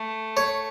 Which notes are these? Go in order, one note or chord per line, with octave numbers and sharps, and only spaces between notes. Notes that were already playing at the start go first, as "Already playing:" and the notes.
Already playing: A3
C#5